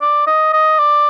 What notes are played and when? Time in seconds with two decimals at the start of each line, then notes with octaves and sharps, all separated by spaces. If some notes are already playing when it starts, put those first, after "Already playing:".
0.01 D5
0.27 D#5
0.53 D#5
0.79 D5